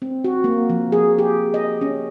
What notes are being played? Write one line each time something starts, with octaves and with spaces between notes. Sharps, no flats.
C4
F#4
A#3
F3
G#4
G4
D#5
C#4